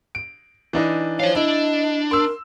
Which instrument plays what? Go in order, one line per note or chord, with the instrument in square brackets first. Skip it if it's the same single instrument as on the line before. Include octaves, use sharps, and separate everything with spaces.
[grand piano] D7
E3 D4 D#4
[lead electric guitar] C5 F5 [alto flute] C#5
[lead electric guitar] D4 [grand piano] E4 [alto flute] D#5
[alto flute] A#4 [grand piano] C6 E6